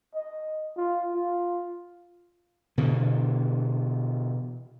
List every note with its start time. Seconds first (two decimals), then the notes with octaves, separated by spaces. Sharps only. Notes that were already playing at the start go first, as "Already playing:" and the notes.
0.14 D#5
0.77 F4
1.14 F4
2.78 B2 D3 E3